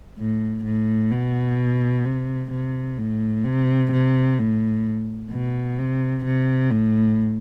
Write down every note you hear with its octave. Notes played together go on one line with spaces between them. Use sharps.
A2
A2
B2
C3
C3
A2
C3
C3
A2
B2
C3
C3
A2